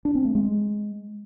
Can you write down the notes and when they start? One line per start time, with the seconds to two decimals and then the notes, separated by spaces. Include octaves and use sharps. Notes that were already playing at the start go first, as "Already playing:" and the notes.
0.05 D4
0.15 C4
0.25 A3
0.35 G#3